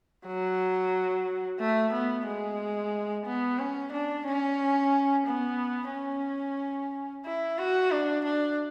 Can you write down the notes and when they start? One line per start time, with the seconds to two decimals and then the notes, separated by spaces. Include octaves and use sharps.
0.26 F#3
1.59 A3
1.93 B3
2.27 G#3
3.26 B3
3.59 C#4
3.93 D4
4.26 C#4
5.26 B3
5.92 C#4
7.26 E4
7.58 F#4
7.91 D4
8.25 D4